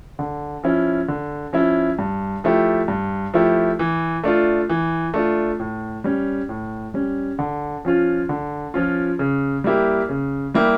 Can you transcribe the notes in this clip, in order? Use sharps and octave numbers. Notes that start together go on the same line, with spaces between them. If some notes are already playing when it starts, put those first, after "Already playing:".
D3
F3 C#4 E4
D3
F3 C#4 E4
G2
F3 A3 E4 G4
G2
F3 A3 E4 G4
E3
A3 D4 F4
E3
A3 D4 F4
A2
G3 C#4
A2
G3 C#4
D3
F3 C#4 F4
D3
F3 C#4 F4
C#3
G3 A#3 E4 G4
C#3
G3 A#3 E4 G4